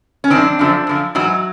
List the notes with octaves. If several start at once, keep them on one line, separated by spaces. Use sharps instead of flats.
C#4
F#2 D#3 C4 D4
F#2 D3 F3
F#2 D3 F3
G#2 E3 F#3